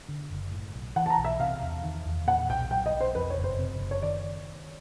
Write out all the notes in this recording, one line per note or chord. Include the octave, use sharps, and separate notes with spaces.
D3
F#1
A2
B1
E3 F#5
A5
A#5
B1
E5
C3 F5
E2
D#3
E2
A#2 F#5
B1 G5
F#3 G5
D#5
B1
C5
F2 B4
C#5
F#1
C5
C3
F#1
C#5
D#3 D5